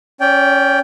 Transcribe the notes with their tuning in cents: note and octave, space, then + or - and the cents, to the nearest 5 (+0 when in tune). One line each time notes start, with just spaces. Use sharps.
C#4 +0 D5 -35 G5 +0